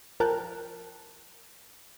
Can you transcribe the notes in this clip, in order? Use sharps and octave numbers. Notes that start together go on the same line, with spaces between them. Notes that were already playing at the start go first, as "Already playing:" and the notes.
F3 A#4 G5 A5 F#6